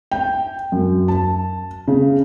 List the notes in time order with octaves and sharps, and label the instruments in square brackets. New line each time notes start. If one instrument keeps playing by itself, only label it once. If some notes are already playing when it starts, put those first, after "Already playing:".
[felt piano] G5
F#2
A5
C#3